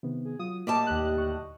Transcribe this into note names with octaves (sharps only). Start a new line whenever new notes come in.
C3 D#3 B3
G#4
F#3 F4 D#6
A2 G3 A#3 D#5 A5 D6
D#2 G4 F#6
D2 D#5 C#6